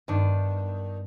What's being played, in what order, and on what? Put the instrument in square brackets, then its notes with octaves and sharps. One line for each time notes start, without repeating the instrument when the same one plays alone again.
[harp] G2 B3 [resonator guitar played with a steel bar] D#3 D4